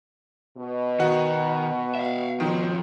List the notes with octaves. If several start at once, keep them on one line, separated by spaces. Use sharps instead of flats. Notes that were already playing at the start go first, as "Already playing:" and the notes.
B2
D#3 F#4
E5 F5
F#2 D#3 F3